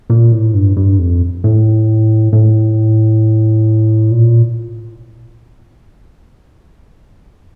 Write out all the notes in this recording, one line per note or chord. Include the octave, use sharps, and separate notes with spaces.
A#2
A2
G2
G2
F2
A2
A2
A#2